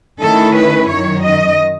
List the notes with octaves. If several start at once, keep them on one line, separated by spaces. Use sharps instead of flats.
D#3 A3 C#4 E4 A4
B4
F#2 D#3 F#3 C#5
D#5